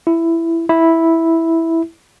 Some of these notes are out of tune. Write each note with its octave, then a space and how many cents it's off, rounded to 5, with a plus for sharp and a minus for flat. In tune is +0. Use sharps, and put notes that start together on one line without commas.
E4 +10
E4 -5